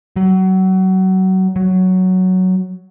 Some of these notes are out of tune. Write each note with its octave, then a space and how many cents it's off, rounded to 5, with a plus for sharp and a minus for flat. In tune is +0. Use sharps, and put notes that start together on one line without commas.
F#3 +25
F#3 +5